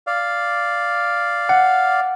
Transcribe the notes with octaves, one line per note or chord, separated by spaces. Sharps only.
D5 F5
F#5